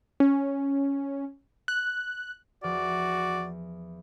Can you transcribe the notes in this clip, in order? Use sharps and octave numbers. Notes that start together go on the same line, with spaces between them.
C#4
F#6
E2 F3 F#4 D5